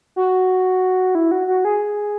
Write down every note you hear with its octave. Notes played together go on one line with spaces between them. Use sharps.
F#4
E4
F#4
F#4
G#4